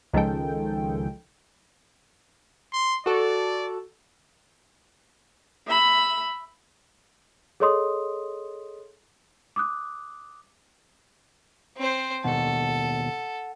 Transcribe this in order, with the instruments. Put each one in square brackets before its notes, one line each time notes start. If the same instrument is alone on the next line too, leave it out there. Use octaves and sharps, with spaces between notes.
[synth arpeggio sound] C#2 D#3 F3 G#3 A4 G5
[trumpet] C6
[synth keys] F#4 A4 [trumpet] D5
[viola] E5 B5
[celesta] G#4 A4 C#5 D#5 C6 D#6
D6 D#6 F#6
[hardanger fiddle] C4 C5
[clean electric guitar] D#2 B2 [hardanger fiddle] A4 [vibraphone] F#5